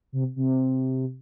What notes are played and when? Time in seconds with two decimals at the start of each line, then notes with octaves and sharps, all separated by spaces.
0.12 C3
0.36 C3